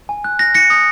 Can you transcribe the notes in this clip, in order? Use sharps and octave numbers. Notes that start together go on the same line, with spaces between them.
G#5
F#6
F#6 A#6
F#6 A#6 C#7
D#6